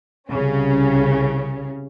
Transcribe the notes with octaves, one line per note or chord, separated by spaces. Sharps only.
C2 C#3 C#4